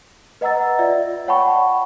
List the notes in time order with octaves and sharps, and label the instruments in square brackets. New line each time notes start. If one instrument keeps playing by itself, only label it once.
[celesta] B4 D#5 F#5 A#5 E6 A6
F4 D5 E5
C#5 F#5 G5 A5 B5 C#6